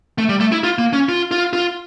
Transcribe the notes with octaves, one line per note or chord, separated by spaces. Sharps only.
A3
G3
A3
E4
F4
A#3
C#4
F4
F4
F4